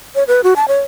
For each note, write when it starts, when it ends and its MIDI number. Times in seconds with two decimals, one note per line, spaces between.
0.15 0.24 73
0.28 0.41 71
0.44 0.54 66
0.56 0.65 81
0.68 0.80 73